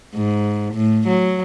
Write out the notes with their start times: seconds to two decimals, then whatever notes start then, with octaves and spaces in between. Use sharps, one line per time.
0.15 G#2
0.74 A2
1.07 F#3